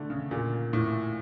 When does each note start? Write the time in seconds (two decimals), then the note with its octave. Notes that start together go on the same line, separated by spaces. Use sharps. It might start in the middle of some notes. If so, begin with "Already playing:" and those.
Already playing: D3 A3
0.10 C#3
0.31 A#2
0.73 A2